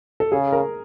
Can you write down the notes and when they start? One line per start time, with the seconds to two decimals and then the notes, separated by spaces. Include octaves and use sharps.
0.20 A4
0.32 C#3 G#4
0.52 A#4